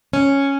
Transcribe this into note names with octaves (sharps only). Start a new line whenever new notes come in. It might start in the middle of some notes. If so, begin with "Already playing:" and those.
C#4